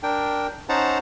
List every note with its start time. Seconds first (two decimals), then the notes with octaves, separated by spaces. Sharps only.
0.03 D4 A#4 G5
0.69 C#4 D#4 C5 F#5 A5 A#5